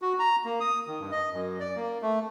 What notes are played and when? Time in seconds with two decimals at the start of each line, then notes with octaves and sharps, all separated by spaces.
0.02 F#4
0.19 A#5
0.45 A#3
0.60 D#6
0.87 D#3
1.00 G2
1.12 D#5
1.33 F#2
1.60 D5
1.76 A#3
2.02 A3